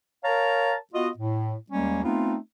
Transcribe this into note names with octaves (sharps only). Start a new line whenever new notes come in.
A#4 C#5 F5 A5 A#5
B3 F4 F#4 D#5
A2
D#2 G3 G#3 A#3 C#4
A3 B3 C4 D#4 F4